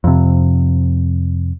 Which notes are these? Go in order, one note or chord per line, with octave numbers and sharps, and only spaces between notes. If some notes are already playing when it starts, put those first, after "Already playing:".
F2 C3